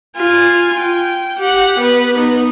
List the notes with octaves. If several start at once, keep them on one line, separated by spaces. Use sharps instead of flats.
F4 G#5
G5
G4 F#5
B3 B4
B3 D#4